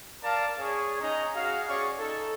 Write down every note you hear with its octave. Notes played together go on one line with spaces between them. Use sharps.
A#4 D5 F5 A5
C#4 G#4 C#5
C#4 D#4 D#5 A#5
F#4 G#4 F5
C#4 G#4 C#5 D5 C#6
D#4 A4